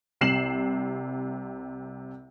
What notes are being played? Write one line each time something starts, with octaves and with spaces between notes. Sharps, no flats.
C2 C3 C7 E7 F#7